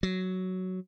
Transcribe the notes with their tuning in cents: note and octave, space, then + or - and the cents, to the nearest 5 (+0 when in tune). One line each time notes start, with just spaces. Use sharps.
F#3 +5